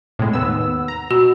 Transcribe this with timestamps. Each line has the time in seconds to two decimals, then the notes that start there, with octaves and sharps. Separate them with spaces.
0.19 A2 C3 G#3
0.33 D#2 B3 E6
0.88 A#5
1.11 B2 F#4